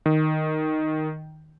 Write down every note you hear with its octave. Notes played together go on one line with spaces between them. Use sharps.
D#3